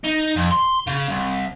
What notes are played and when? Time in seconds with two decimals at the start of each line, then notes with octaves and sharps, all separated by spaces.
0.04 D#4
0.36 F2
0.51 C6
0.87 C#3
1.09 C2